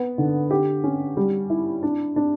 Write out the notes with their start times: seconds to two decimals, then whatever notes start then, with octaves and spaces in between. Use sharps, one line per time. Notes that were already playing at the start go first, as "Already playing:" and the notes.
Already playing: B3
0.18 D3
0.51 G4
0.84 C#4
1.17 G3
1.50 E4
1.83 D4
2.16 D4